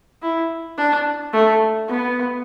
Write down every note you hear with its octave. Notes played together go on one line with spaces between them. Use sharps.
E4
D4
A3
B3